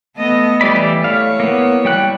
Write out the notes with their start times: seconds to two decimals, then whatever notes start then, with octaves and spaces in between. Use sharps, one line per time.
0.16 A3 B3 D#5
0.61 E3 G3 D5 B5
1.04 A3 E4 C#5 F5
1.40 A#3 B3
1.85 G3 G5 F#6